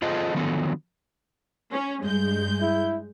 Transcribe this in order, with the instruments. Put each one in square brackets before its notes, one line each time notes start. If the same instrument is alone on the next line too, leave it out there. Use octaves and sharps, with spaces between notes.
[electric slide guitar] F4 G#4 A4 C5 D#5
D3 D#3 F3 F#3 B3 A4
[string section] C#4
G2 G#3 G6
[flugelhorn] E4